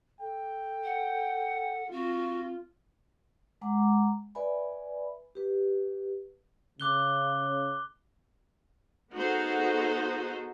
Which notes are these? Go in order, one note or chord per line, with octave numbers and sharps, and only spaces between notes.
A4 G5
F#5
C4 F4 F#4
G#3 F#5 G#5 A#5 D6
B4 D5 E5 G#5 B5
G4 B4
C#3 D6 F#6 G7
B3 D#4 F#4 G#4 A4 C5